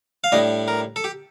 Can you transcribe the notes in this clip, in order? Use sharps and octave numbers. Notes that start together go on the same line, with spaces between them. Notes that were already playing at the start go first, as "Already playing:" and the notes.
F5
A2 G3 D4 D#5
A#4
A4
G4